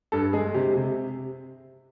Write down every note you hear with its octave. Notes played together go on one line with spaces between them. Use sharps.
G2 A4
G#3 G#4
C3 G4
C3